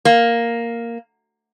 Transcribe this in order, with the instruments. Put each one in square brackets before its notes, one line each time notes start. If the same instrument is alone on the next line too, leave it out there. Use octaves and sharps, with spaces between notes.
[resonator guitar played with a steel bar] A#3